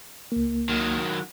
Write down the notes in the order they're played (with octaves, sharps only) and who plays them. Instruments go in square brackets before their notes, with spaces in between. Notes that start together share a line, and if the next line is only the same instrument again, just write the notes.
[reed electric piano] C#2 A#3
[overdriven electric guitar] D#3 F#3